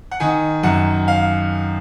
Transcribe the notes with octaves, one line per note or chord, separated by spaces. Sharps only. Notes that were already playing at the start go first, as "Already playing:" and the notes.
F#5
D#3 G#5
F#2 F#5
F5